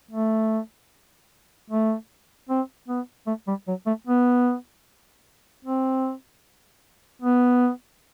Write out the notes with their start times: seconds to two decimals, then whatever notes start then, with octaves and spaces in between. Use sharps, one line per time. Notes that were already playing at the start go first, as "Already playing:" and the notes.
0.11 A3
1.70 A3
2.49 C4
2.88 B3
3.27 A3
3.48 G3
3.68 F#3
3.86 A3
4.07 B3
5.65 C4
7.22 B3